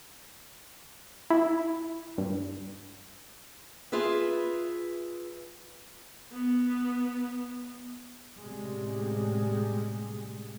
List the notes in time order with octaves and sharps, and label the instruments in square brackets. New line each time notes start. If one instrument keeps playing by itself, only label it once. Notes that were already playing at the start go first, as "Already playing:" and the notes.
[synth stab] E4
G2
[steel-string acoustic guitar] F4 G#4 B4 E5
[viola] B3
[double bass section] A1 C3 G3 G#3